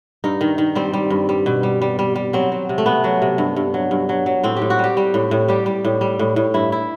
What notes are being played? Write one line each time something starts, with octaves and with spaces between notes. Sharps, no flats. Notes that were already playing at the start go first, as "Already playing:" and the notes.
G2 D#4
D#3
D#3
G3 C4
G3
G2
G3
B2
G3
G3
G3
G3
F#3 C4
F#3
C3
A3
C3 B3
F#3
C3
G2
G2
F#3
G2
F#3
F#3
A2 C4
G4
A2
F#4
G3 G4
G3
A2
A2
G3 G4
G3
A2
G3
A2
A2
G2 E4
E4